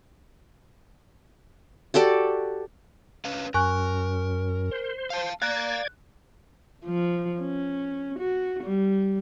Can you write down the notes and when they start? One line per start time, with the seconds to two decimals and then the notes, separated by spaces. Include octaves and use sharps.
1.94 F#4 G4 A4 D5
3.25 C#4 B4 F5
3.54 F#2 A#4 G#5 C#6 F#6
4.71 C5
5.10 F5 A5
5.42 D5 F5 A#5 F#6 G#6
6.85 F3
7.41 C#4
8.18 F#4
8.63 G3